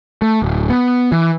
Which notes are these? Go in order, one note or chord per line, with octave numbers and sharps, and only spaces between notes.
A3
D1
B3
E3